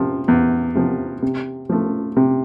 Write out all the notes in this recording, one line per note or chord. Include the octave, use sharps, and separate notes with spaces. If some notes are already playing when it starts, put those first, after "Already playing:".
Already playing: C3 F3
E2
C3 F3
C3
F3 A3
C3